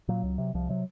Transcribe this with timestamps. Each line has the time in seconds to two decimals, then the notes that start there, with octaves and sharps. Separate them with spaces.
0.08 A#2 F#3
0.23 C#2
0.38 C3
0.54 C2 F3
0.69 C3 F#3